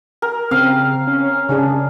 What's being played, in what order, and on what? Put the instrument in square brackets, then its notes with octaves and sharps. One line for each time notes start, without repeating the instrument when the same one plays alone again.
[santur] A#4
[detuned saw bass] C#3 [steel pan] C4 [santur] F5
[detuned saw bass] C#4
[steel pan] C#3 D4 G#4